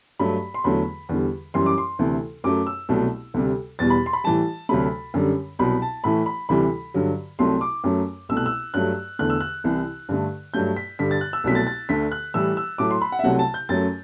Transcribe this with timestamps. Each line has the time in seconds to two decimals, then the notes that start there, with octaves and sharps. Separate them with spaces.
0.19 G2 F#3 A3 B5
0.54 C6
0.64 E2 D3 F#3 A3 B5
1.09 E2 D3 G3
1.54 F#2 E3 G3 C6
1.66 D6
1.78 C6
1.99 D2 C3 E3 A3
2.44 F#2 F#3 A3 D6
2.67 E6
2.89 C2 B2 F#3 A3
3.34 D2 C3 G3
3.79 E2 B2 G3 A6
3.90 B5
4.06 C6
4.13 B5
4.24 A2 E3 G3 A5
4.69 D2 C3 F#3 A3 B5
5.14 F#2 D3 G3
5.59 C2 B2 F#3 B5
5.82 A5
6.04 A2 E3 A3 B5
6.26 B5
6.49 D2 C3 E3 G3 B5
6.94 G2 D3 F#3
7.39 C2 C3 F#3 A3 C6
7.61 D6
7.84 F#2 F#3 A3
8.29 C2 B2 A3 E6
8.37 F#6
8.46 E6
8.74 G2 F#3 A3 F#6
9.19 E2 D3 A3 F#6
9.30 E6
9.40 F#6
9.64 C2 C3 E3
10.09 G2 D3 A3
10.54 G2 F#3 A3 G6
10.76 B6
10.99 G2 D3 G3 B6
11.11 A6
11.21 F#6
11.33 E6
11.44 C2 B2 F#3 A3 B6
11.55 A6
11.67 A6
11.89 D2 D3 A3 B6
12.12 F#6
12.34 A2 E3 G3 E6
12.57 E6
12.78 A2 F#3 A3 D6
12.91 C6
13.02 B5
13.12 F#5
13.19 E5
13.24 C2 C3 F#3 A3 F#5
13.39 A5
13.54 G6
13.69 F#2 F#3 A3 A6